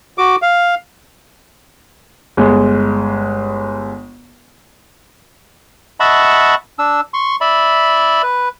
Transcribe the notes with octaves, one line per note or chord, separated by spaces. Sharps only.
F#4 D6
F5
G1 G#3
D#5 E5 F#5 A5 B5 C#6
D4 E6
C6 C#6
D5 E5 B5
B4